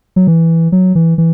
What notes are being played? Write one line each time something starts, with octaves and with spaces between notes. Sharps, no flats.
F#3
E3
F#3
E3
E3